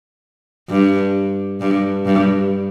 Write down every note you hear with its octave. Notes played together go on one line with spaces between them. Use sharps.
G2
G2
G2